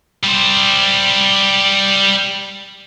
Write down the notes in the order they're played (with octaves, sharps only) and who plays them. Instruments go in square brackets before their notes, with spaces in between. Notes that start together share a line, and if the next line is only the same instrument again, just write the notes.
[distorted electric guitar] G3 C5